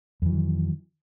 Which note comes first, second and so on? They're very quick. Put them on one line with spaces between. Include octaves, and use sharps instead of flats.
F2 E3 F#3 D#3